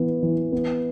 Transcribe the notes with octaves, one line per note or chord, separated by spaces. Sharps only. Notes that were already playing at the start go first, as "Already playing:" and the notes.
Already playing: E3 B3
E3
B3